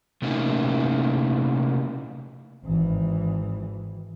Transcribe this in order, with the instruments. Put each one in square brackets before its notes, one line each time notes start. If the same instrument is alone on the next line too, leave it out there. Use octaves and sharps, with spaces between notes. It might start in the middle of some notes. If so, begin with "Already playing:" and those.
[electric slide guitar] C3 A3 A#3 C#4 D#4 E4
[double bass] G#1 E3